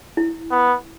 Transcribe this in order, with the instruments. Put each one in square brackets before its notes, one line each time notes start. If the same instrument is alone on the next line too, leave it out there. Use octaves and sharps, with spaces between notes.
[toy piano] E4
[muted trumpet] B3